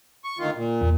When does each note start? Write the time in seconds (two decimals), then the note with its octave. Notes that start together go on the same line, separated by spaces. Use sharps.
0.24 C#6
0.39 D2 D#3 F4
0.56 A#2
0.81 E2 A#3